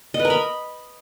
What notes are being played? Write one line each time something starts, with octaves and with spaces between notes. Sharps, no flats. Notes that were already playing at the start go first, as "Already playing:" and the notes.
D#5
B4
A#4
B5